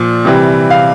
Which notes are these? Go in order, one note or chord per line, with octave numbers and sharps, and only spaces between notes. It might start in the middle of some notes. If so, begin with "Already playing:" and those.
Already playing: A#2 F3
C3 E3 G3
F5